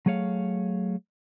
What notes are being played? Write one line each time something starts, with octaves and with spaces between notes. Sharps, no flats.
F#3 A3 G#4 C#5 F5